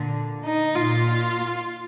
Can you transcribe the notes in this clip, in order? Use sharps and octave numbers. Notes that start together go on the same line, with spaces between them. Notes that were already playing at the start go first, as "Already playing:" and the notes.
Already playing: A#2 D3
D#4
A#2 F4